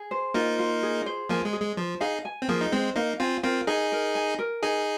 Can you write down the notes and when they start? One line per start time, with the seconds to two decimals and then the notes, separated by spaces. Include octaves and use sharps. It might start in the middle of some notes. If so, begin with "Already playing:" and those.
Already playing: G#4
0.11 C5
0.34 A#3 D#4 F4
0.59 F4
0.83 G#4
1.06 C5
1.29 F3 A#3 G#5
1.45 G#3
1.53 G#4
1.62 G#3
1.77 F3 C5
2.00 D#4 G#4 F5
2.25 G#5
2.42 C4
2.49 F3 A#3 G#4
2.61 D#4
2.72 G#3 C4 C5
2.96 A#3 D#4 F5
3.20 C4 F4 G#5
3.43 C4 F4 A#4
3.67 D#4 G#4 G#5
3.92 A#4
4.15 G#5
4.39 A#4
4.63 D#4 G#4 G#5